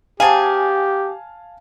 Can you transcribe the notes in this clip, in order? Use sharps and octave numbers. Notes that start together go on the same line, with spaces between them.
F#3 C4 G4 G#4 F5 G#5 A5